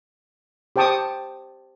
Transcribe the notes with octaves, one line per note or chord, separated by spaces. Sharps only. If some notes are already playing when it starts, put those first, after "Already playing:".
G4 C5 G5 A5 C#6 D#6